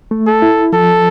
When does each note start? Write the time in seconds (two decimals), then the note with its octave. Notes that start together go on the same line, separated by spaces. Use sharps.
0.11 A3
0.27 A4
0.42 E4
0.73 F3 A4